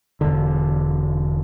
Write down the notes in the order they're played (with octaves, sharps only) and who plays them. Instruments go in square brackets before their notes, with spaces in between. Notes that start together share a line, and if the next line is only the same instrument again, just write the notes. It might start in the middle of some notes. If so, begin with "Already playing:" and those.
[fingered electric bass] E1 D3